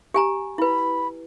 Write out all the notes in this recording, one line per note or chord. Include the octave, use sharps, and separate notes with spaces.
G4 G#5 A#5
E4 B4 B5